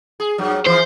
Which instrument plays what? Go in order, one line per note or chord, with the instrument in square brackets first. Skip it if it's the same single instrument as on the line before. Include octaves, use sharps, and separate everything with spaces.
[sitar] G#4
G2 A#2 F#3
[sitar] E3 F3 [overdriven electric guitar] C5